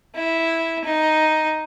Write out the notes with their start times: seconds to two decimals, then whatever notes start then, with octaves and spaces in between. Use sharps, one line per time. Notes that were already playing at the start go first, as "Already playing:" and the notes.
0.15 E4
0.84 D#4